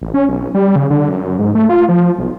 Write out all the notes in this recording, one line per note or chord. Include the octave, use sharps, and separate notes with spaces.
A1
C#4
B1
G3
C#3
D3
F#2
G#2
A3
F4
F3
B1